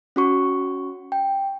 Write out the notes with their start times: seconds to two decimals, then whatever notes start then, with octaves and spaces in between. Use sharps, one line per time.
0.16 C#4 F#4 C#6
1.12 G5